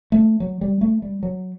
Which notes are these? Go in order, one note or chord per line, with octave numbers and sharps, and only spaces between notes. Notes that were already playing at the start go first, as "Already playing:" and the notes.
A3
F#3
G3
A3
G3
F#3